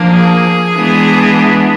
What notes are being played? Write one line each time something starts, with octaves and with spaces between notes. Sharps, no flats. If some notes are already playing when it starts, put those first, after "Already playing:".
Already playing: F3 A#3 D4
G#4
E3 G#3 B3 D4